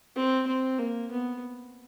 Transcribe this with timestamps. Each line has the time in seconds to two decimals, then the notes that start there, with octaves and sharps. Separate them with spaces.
0.16 C4
0.47 C4
0.78 A#3
1.11 B3